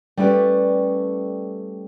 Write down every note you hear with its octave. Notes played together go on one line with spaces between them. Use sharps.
G3 A3 C#4 E4 B4 D5